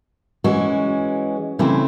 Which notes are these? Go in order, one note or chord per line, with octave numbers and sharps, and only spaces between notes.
E3 G#3 C#4 F#4
C#3 E3 A3 C4 E4